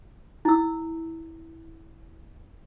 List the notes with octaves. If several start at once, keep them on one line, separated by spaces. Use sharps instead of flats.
E4 E6